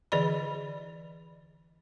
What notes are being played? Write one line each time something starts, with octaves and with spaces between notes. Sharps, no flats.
D3 E3 G#4 D5 D#5 B5